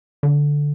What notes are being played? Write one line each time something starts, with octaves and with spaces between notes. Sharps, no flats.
D3